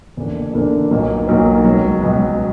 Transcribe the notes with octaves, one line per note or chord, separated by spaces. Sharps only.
F#1 E2 D3 A#3 D4
F#1 E2 D3 A#3 D4
B1 A#2 F#3 A#3
B1 A#2 F#3 A#3
C#2 B2 F#3
C#2 B2 F#3